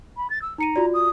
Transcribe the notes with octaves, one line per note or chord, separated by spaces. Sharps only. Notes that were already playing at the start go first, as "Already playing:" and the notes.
B5
A6
E6
D#4 A#5 C#7 D#7
F4 F#4 D5
D#6